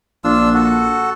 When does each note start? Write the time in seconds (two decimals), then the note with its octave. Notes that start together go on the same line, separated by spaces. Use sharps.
0.24 A#1 D4 F4 E6
0.54 F#4 A4